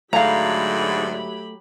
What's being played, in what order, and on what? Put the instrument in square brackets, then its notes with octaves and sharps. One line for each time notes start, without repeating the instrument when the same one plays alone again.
[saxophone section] G#2 D3 [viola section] F#3 G4 B5 [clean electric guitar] A3 [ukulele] F5 A#5